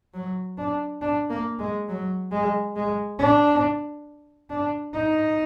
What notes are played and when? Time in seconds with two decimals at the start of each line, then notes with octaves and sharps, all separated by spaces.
0.13 F#3
0.58 D4
1.02 D4
1.30 A#3
1.59 G#3
1.88 F#3
2.32 G#3
2.76 G#3
3.19 D4
4.50 D4
4.94 D#4